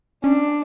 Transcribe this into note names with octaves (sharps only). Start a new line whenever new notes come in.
C#4 D4